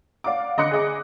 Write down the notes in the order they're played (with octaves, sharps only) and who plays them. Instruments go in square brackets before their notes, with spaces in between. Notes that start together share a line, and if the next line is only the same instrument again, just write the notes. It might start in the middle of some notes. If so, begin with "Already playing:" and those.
[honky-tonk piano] D5 F5 F#5 D6
D3 D#5 C6 D6 F#6 C#7
G#4 D#5 D6